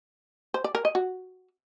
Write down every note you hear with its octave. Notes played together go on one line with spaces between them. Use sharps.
C5
D5
A#4
D#5
F#4